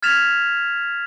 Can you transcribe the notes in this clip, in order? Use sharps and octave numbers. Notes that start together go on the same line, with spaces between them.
F6 G#6 A6 B6 E7 F7